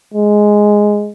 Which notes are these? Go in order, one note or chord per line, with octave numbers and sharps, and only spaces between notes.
G#3